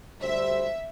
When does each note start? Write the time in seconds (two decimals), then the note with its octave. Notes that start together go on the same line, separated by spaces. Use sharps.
0.21 D2 G3 C5 E5